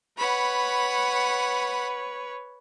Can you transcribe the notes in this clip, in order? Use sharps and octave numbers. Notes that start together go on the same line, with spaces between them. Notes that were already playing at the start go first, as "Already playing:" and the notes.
B4 C#5 F#5 B5